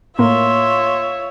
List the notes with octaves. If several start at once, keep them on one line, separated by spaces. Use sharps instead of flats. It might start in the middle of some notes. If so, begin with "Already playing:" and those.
A2 A#3 F4 C#5 E5 C6